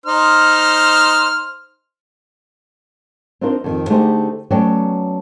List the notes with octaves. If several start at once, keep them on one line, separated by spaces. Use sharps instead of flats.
D#4 C5 F6
C4 D4 D#4 F4 A#4 C5
F2 D#3
D3 A3 D#4 G4 G#4 C5
F#3 A3 B3 C#4 D5 G5